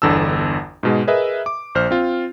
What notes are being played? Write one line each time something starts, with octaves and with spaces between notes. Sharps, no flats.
G1 E2 D3 A5 E6
G#2 B2 G#3
G#4 A#4 B4 D#5 E5
D6
A#1 C5 F6
C4 F4